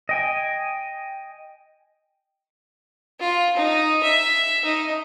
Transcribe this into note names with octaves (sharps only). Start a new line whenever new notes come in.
D#5 G5 G#5
F4
D#4
E5
D#4